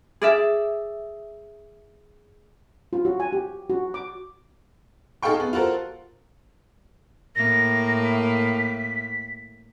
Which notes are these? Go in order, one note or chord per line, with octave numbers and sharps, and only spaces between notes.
G#4 D5 E5
F4
F#4
G#5
G4
F#4
D6
D#4 G#4 A4 F5 G5 C#6
B3
F4 F#4 A4 A#4 C5
A2 A#3 A#6
B6